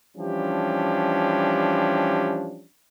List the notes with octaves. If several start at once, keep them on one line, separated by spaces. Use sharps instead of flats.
E3 F3 G3 C#4 D4 G4